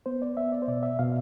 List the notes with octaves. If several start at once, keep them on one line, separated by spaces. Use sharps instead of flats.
B3 C5
D5
B3 E5
D5
C5
B2 D5
E5
B2 F5